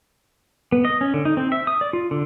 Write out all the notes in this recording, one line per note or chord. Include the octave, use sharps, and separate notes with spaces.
B3
D#5
C#4
D3
D#4
C4
E5
D#6
D5
F4
D3